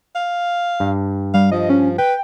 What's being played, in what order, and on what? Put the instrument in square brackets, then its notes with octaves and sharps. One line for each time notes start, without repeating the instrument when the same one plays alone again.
[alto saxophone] F5
[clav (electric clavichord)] G2
[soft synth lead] G3 [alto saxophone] F5
[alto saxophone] F3 [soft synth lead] D#5
[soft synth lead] C#4
[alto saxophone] B4 [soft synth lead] G5